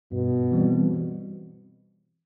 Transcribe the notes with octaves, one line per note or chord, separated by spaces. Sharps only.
G2 B2
E3 G3 C4